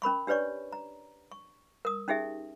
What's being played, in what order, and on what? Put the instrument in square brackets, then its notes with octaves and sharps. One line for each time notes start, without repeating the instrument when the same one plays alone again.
[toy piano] C#4 A#4 B5 C#6
D4 G4 B4 C#5 D5 C#6
A#5
C#6
A#4 D#6
C#4 D#4 G4 G#4 E5